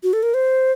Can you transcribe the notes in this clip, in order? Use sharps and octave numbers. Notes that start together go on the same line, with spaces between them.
F#4
A4
A#4
C5